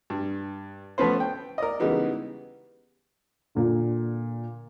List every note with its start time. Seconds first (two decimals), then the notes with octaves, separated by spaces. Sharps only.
0.10 G2
0.98 F3 A3 B3 C#4 B4 C5
1.20 G5
1.58 A#4 D5 D#5
1.80 C#3 E3 G3 G#3 B3 D#4
3.55 A#2 D3